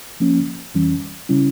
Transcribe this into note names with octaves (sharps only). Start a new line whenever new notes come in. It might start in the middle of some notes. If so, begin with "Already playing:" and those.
F3 A#3 C#4
F2 E3 G3 C#4
C#3 G3 C#4 E4